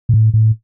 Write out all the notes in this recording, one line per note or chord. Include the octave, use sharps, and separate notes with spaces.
A#2
A2
A2